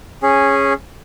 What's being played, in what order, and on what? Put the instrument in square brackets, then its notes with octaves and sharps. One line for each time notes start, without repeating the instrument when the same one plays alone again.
[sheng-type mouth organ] C#4 G#4